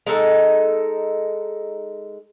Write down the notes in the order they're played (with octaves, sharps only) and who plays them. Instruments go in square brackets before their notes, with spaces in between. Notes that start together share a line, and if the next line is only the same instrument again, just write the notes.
[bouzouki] G#3 D#4 A4